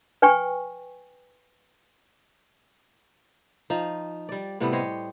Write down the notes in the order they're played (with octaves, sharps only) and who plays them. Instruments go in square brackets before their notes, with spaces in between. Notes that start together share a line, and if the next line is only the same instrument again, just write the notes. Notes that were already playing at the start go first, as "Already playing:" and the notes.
[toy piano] B4 G5 G#5 C#6
[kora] F3 D#4
G3 D5
A2 C3 G3 B3
G4 C5 C#5 D#5